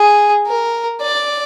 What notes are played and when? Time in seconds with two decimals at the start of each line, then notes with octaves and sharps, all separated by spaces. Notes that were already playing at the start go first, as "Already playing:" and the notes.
Already playing: G#4
0.47 A#4
1.02 D5